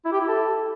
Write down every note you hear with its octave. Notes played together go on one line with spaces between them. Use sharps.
E4
G4
E4
A4